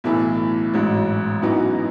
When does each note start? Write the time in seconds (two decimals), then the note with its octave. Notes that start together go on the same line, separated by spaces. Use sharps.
0.04 B1 A2 E3 A3
0.74 A1 G#2 F#3
1.42 F#2 E3 B3 D#4 F#4